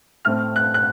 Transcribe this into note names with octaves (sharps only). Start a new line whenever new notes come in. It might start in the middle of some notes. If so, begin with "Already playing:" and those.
A2 A3 C4 F6
F#6
F#6